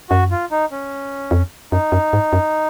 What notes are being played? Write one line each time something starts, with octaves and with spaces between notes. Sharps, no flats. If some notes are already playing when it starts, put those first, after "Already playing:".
F#2 F#4
F4
D#4
C#4
F2
F#2 D#4
F#2
G#2
F#2